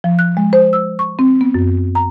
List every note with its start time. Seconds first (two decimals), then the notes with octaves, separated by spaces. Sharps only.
0.04 F3
0.19 F#6
0.37 G#3
0.53 C5
0.73 E6
0.99 C#6
1.19 C4
1.41 B3
1.54 F#2
1.95 A#5